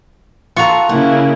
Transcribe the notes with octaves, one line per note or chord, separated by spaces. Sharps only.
F4 F#4 A4 A#5 C#6
C#3 A#3 E4 F#5